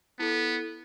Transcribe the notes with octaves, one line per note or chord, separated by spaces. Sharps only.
B3 E4 A4